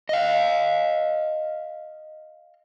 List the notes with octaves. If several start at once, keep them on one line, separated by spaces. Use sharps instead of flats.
D#5 F5